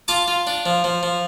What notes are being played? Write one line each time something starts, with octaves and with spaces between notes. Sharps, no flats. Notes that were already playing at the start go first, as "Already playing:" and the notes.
F4 A5 D6
F4
D4
F3
F3
F3